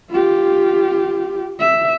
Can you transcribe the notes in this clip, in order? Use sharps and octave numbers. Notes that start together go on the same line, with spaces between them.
F4 G4
E5